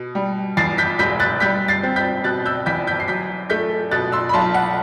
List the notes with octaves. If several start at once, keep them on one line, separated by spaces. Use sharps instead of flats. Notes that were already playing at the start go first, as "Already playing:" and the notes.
Already playing: B2
G3
E2 A6 C7
G6 B6
E1 G6 B6
F#6 A6
G3 G6 B6
A6 C7
C4
G6 B6
B2 F#6 A6
E6 G6
E2 G6 B6
G6 B6
C7
F#3 G6 B6
A3 G6 B6
B2 F#6 A6
C6 E6
B5
B1 A5 C6
F#5